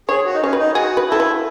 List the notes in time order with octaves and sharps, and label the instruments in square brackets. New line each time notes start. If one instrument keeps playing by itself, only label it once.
[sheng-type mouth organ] G#4 [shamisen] C#5
[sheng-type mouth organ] F#4
D#4
[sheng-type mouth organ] C#4 [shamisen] C#5
[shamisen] B4
[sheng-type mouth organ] D#4
[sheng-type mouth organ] F#4 [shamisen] G#4
[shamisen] B4
[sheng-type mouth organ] E4 [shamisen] A4
[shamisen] B4